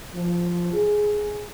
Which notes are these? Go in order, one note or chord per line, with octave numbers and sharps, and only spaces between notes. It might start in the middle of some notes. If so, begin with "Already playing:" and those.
F3
G#4